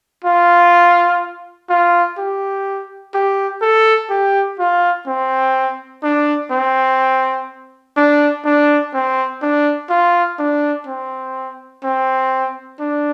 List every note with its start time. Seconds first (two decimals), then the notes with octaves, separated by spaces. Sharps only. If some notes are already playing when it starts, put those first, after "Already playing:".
0.24 F4
1.69 F4
2.18 G4
3.14 G4
3.62 A4
4.10 G4
4.59 F4
5.07 C4
6.03 D4
6.52 C4
7.97 D4
8.45 D4
8.94 C4
9.42 D4
9.90 F4
10.39 D4
10.87 C4
11.83 C4
12.79 D4